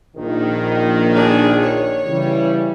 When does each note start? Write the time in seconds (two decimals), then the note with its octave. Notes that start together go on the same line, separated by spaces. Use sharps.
0.16 A#1 D#3
1.13 D4 G#4
1.61 C#5
2.06 C#3 E3 G3